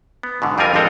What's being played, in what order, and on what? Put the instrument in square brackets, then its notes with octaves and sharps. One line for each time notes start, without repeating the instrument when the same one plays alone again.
[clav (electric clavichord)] B3
G#2 B2 D3 D#3
F2 G3 C4 F4 A#4 G#5
G#1 F2 G#3 C4 A4 A#5